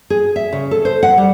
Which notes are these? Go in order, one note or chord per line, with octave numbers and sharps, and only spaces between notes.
G#4
E5
C#3
A4
C5
F#5
G3